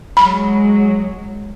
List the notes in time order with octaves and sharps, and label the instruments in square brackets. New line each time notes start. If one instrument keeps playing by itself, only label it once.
[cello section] F#3 G#3 [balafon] B5